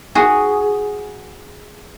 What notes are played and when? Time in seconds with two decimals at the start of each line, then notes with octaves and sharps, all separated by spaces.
0.15 F#4 G#4